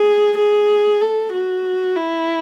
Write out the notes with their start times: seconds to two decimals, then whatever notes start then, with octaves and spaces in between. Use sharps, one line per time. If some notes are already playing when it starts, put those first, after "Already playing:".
Already playing: G#4
0.38 G#4
1.02 A4
1.33 F#4
1.96 E4